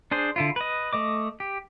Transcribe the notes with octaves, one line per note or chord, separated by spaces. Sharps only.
D4 G#4 C5
D3 E4 F4
B4 D#5
A3 D#5 D6
G4